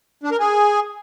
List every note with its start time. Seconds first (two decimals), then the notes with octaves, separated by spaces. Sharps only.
0.23 D4
0.31 A#4
0.40 G#4